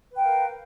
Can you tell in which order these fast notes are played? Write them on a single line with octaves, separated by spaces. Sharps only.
B4 G5 F5 A#4